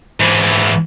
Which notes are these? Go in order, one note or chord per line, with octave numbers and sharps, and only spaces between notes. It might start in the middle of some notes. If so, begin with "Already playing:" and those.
G#2 E3